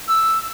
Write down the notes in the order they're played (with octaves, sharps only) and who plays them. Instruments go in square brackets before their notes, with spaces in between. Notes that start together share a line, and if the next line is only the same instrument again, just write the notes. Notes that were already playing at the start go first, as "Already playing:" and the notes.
[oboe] E6